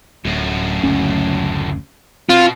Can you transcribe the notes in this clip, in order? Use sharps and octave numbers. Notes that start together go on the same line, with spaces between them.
D1 F#2 A2
F#1 D2 C#4
B2 C4 F4